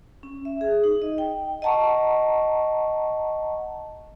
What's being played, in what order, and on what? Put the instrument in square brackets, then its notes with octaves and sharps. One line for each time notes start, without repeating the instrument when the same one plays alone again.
[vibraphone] C#4
E5
G#4
D#4
D#5
G5
D#5 F#5 A5 A#5 C#6